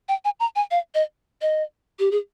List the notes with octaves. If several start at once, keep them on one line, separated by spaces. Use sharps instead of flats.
G5
G#5
A#5
G#5
F5
D#5
D#5
G4
G#4